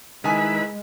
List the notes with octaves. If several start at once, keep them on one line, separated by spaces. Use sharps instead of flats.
D#3 G#3 E4 B4 G#5 B5